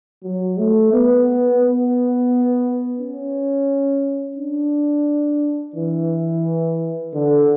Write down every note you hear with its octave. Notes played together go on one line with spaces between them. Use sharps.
F#3
A3
B3
B3
C#4
D4
E3
D3